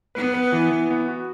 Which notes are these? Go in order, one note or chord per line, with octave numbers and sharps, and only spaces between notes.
B3 B4
B4
E3
E3
B3
F#4